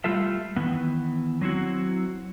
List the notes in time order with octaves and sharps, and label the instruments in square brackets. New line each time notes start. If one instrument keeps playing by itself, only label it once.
[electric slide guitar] G3 A3 F4 A4 E5
D#3 E3 B3
F#3 C4 E4 F#4